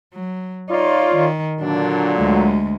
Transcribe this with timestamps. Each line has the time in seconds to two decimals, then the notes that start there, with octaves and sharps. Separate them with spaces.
0.13 F#3
0.70 D#4 F4 C#5 D5
1.15 D#3
1.61 A#2 D3 F#3 D4
2.18 D2 G#3